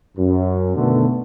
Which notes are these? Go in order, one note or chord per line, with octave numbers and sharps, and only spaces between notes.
F#2
B2 D3 D#3 A3 B3